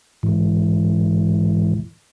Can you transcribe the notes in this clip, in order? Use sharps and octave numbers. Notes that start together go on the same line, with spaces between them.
G#2 E3